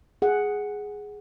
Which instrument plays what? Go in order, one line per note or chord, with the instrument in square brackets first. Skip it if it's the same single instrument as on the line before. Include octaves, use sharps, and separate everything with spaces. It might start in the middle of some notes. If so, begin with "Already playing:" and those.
[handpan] G#4 F#5